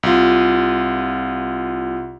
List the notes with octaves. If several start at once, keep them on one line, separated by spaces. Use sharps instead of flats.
C2 F4